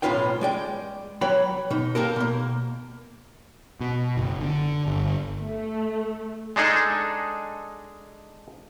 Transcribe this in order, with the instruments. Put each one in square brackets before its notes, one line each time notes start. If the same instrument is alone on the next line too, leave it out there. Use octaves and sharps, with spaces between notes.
[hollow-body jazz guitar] B1 A2 C#4 F4 B4 G5
G#3 D5 G5
F#3 B4 C#5 G5 B5
B2 D#4
A#3 G4 A4 A#4
B2 A#3
[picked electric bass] B2
F#1
D3
G1
[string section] A3
[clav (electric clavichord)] G#3 D4 D#4 G#4 A4